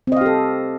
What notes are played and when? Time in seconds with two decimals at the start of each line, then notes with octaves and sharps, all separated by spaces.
0.07 C4
0.12 D#5
0.17 F5
0.21 G4
0.26 A4